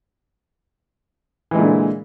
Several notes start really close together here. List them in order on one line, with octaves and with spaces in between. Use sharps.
E3 G#3 A#2 D3